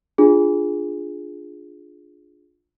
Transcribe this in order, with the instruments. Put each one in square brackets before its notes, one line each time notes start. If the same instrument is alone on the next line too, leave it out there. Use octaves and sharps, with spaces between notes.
[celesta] D4 F4 G#4